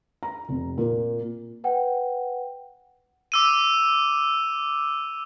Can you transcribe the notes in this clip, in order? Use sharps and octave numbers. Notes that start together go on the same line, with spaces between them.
A#5
F1
A#2
B4 F#5 G5
D6 E6 D#7